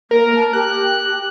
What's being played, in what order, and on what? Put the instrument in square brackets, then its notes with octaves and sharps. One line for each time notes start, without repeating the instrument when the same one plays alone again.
[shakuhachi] A#3 [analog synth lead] A#4
[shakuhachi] A5
[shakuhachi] G4 [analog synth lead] F#6